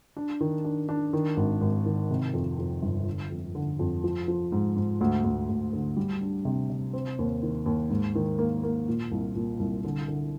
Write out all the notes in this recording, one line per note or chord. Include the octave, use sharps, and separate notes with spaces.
D4
D#3
D4
D4
D#3
G#1
G#1
D#3
C3
F2
F2
G1
D3
F2
D3
F2
F3
F3
G#2
G#2
D2
D2
D2
D3
G3
D4
C3
C3
C4
D#2
D#3
D#2
G#2
D#3
A#3
A#3
A#2
C2
A#2
C2
D3
D3